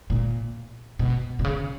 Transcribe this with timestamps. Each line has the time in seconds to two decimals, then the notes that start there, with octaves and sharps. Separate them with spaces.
0.10 A#2
0.99 B2
1.39 B2
1.44 C#3